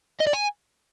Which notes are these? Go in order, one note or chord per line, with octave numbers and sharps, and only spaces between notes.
D#5
D5
G#5